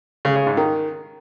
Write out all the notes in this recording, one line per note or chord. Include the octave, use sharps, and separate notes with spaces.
C#3
C#3
G#2
D#3